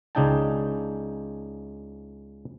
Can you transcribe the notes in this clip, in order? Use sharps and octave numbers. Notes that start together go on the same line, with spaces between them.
C#2 C#3 D4 D#4 G5 A5